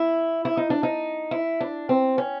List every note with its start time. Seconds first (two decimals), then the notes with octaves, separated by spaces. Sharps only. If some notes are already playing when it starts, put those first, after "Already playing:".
Already playing: E4
0.45 E4
0.57 D#4
0.70 D4
0.83 D#4
1.31 E4
1.60 D4
1.89 C4
2.18 C#4